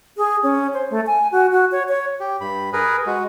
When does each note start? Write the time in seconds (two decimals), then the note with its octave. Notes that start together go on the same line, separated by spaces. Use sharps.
0.17 G#4
0.43 C#4
0.74 C5
0.90 A3
1.07 G#5
1.32 F#4
1.51 F#4
1.72 C#5
1.89 C#5
2.20 G4
2.41 G2 B5
2.73 G#4 A#4 B4
3.06 G#3 F#4